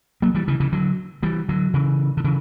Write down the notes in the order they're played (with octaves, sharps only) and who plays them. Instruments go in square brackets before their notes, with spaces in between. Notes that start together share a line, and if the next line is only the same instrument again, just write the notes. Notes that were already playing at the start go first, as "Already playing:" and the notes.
[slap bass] F#3 A#3
E3 G3
C#3 E3
C#3 E3
D3 F#3
E3 G3
D3 F#3
C#3 E3
D3
C#3 E3